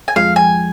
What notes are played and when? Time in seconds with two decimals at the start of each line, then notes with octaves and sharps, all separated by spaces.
0.08 G#5
0.16 F2 F3 G#3 F5
0.36 G#5